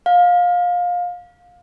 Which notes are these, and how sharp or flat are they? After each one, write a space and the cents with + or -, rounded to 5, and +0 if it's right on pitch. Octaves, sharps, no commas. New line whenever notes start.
F5 +25